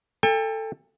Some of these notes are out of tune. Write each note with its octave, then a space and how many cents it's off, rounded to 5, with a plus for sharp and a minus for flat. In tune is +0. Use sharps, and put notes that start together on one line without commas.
A4 +10 G5 +40